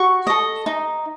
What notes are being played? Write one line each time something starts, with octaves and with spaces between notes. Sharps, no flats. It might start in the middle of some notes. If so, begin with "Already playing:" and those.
Already playing: F#4 C#6
A4 D#5
D#4